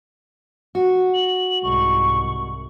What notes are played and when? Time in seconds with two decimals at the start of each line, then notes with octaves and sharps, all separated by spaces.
0.75 F#4
1.14 F#7
1.63 C2 G#2 C#6